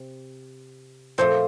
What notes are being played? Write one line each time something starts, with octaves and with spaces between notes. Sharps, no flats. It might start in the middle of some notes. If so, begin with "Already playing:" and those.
Already playing: C3
A#2 F3 A3 C4 C5